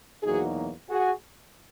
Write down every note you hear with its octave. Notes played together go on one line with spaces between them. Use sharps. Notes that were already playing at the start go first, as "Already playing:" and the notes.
E2 B2 F#3 A#3 D#4 F#4 G#4
F#4 G#4